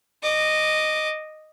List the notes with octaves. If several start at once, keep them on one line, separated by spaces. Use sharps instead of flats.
D#5 D6